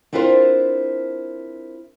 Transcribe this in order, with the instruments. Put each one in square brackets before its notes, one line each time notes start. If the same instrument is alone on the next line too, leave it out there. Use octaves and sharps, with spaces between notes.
[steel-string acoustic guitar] C4 D4 E4 F4 A#4 C5